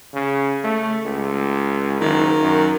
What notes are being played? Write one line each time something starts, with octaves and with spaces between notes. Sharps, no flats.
C#3
A3
C#2
F#1 D#3
F#2